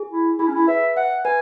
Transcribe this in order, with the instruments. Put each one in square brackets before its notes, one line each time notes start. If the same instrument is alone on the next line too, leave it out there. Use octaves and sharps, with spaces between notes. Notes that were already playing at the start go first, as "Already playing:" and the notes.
Already playing: [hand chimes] G#4
[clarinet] E4
[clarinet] E4 [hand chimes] G#4
[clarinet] C#4
E4
[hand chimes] B4 [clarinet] E5
[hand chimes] E5 [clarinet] F#5
[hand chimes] B4 [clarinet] G#5